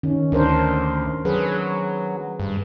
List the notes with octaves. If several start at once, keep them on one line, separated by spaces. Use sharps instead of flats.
D#3 C#4
D2 D4 A#4 C5
F#3 G#4 B4
G2